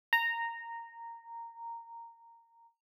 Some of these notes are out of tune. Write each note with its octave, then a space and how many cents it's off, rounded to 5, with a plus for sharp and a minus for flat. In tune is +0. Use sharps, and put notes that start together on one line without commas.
A#5 -10